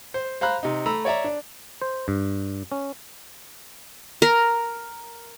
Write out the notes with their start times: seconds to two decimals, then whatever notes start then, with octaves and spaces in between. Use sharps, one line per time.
0.14 C5
0.41 C5 F5 A#5 B5 F#6
0.63 C3 D#4
0.86 A3 A#5 B5 E6
1.05 C#5 D5 E5 A#5
1.24 D4
1.82 C5
2.08 G2
2.72 C#4
4.22 A#4